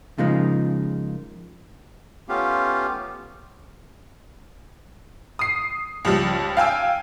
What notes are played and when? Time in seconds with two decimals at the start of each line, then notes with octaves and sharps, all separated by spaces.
0.18 C#3 F3 G#3 A#3 D#4
2.29 A3 B3 C#4 F4 G4 F5
5.39 D#6 C7
6.05 C#2 F3 G3
6.57 F5 G5 G#5 E6